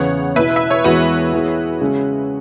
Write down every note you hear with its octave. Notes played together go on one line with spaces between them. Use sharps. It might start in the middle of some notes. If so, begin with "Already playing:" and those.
Already playing: E2 C#3 E3 B3 C#5 F#5
B2 B3 E4 B4 E5
E5
C#5
E2 E3 G#3 B3 F#4 B4
E3 B3 E4 G#4
C#3 G#3 C#4 G#4